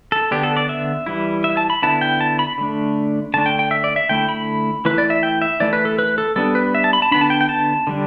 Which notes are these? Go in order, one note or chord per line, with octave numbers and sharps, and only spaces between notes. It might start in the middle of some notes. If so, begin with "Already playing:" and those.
A4
D3 B3 D4 G4
A4
D5
E5
E3 G3 E4
E5
A5
B5
D3 B3 E4 A5
G5
A5
B5
D3 A3 D4
D3 A3 D4 A5
G5
G5
E5
D5
E5
D3 A3 E4 G5
B5
E3 A3 E4 B4
D5
E5
G5
E5
E3 A3 E4 D5
B4
A4
B4
A4
G3 B3 D4 A4
B4
E5
A5
B5
A5
D3 B3 D4 B5
A5
G5
G5
A5
D3 G3 D4